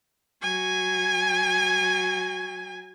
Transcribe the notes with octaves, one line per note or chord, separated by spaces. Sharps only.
F#3 G#5